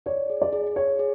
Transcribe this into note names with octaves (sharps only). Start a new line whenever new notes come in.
C#5 D5
G#4
D5
G#4
G#4 C#5
G#4